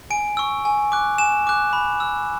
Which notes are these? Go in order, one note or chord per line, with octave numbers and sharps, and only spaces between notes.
G#5 D7
C#6 E6
G#5
D6 F#6
G#5 E7
D6 F#6
B5
E6